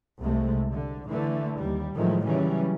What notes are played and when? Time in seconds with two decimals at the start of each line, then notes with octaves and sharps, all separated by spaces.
0.20 C2 C3 G#3 A3
0.72 D3
1.08 D3 E3 A3
1.59 D#2 G3
1.95 A2 D#3 F3 F#3 G#3 A3
2.26 C#3 E3 F#3 G3 C#4